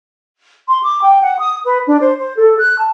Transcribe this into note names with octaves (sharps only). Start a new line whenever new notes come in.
C6
D6
G5
F#5
D#6
B4
D4
C5
C5
A4
F#6
A5